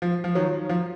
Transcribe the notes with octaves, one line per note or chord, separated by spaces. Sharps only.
F3
F3
D#3 F#3
F3